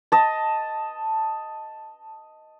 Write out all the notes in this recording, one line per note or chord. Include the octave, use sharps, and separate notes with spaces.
D#5 A5